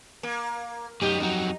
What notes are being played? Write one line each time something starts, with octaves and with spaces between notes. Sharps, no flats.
A#3
F#2 D#4 G4
F2 F#3 D#4